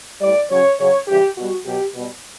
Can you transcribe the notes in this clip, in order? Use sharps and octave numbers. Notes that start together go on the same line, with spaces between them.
A2 G3 D5
C#3 F#3 C#5
C#3 F#3 C#5
C#3 E3 G3 G4
B2 G3 F#4
B2 F#3 G4
B2 G3